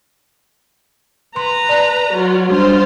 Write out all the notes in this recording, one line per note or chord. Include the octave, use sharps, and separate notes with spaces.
B4 A#5 C6
D5 A5
F#3 F4
G3 D4 F4 C5